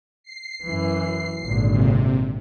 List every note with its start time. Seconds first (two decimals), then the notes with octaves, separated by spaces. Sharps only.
0.24 C7
0.64 F#2 E3
1.43 G#1 A#2 D3
1.72 C3